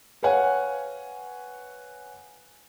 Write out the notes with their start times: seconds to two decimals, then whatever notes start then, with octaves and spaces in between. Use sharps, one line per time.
0.23 B4 C#5 F5 F#5 G#5